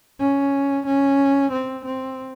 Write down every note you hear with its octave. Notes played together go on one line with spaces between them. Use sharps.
C#4
C#4
C4
C4